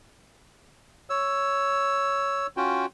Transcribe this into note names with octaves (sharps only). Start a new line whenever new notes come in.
C#5 E6
C#4 F4 F#4 G5